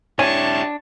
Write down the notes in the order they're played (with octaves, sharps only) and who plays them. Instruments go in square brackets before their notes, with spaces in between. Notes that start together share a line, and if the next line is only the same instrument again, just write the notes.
[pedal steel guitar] D4 [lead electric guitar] E4 G4 [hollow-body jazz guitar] C#5 G#5 [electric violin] A5 C#6